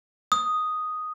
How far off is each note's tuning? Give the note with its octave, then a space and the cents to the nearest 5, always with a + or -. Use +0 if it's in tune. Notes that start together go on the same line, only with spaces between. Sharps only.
D#6 +0